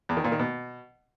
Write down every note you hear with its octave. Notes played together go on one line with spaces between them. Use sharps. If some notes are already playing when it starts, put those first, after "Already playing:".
E2
D#3
A#2
D#3
B2